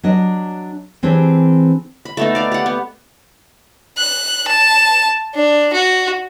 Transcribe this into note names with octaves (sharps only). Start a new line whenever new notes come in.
F#3 D4 D#5
E3 C4 D4 G4 G#4
B5
A3 B3 D#4
D5 F5
G4 F#5
B3
F#6
A5
D4
F#4